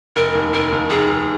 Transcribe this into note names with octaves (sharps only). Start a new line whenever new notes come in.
F1 A#4
D#2
F1 A#4
D#2
F1 G#4
F1